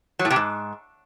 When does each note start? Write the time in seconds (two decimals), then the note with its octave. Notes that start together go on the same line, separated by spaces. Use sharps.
0.19 F#3
0.25 A2
0.30 C3
0.36 G#2